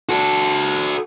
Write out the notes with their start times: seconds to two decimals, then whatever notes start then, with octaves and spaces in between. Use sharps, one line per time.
0.09 F#4 A4